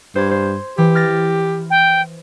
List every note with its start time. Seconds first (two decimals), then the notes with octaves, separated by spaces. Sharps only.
0.15 G2 C5 G#6
0.31 C5
0.78 E3 G4
0.95 F6 A6 A#6
1.70 G5